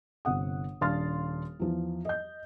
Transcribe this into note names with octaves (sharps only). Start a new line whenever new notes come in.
G1 C3 F#5 D#6
D#1 D4 F5 C6 F6 A6
E2 F3
D#5 G6